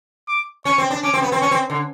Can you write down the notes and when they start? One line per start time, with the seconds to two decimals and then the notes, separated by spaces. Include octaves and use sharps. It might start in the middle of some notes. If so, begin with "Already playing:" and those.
0.28 D6
0.65 C#4 C#6
0.78 C4
0.91 D4
1.03 C#4 D6
1.14 C4
1.22 B3
1.32 C4
1.41 C#4 C#6
1.51 C4
1.70 D3